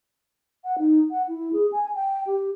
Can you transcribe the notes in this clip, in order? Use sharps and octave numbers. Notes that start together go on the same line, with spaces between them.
F#5
D#4
F#5
E4
G#4
G#5
G5
G4